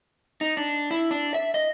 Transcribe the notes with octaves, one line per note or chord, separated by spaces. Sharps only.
D#4
D4
E4
D4
E5
D#5